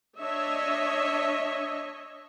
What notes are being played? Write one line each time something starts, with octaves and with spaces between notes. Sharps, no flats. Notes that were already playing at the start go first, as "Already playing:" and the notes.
D4 C#5 D#5 E5